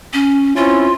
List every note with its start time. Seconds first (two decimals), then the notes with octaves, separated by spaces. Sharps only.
0.13 C#4
0.56 C4 C#4 E4 F4